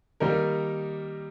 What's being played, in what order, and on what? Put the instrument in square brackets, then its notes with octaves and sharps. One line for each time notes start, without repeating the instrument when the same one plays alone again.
[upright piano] D#3 G3 A#3 D#4 A#4